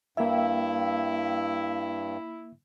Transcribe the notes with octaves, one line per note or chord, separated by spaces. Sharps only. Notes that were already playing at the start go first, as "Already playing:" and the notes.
G2 A#3 E4 E5 F5 G5